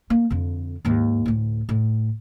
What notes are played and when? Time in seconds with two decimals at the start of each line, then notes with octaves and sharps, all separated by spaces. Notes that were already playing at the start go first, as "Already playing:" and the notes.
0.10 A#3
0.30 F2 D3
0.85 D#2 G#2
1.26 D2 A2
1.69 A2